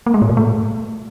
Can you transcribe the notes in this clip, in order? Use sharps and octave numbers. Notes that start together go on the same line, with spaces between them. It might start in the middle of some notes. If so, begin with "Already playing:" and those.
A#3
G#3
A2
A#2
A3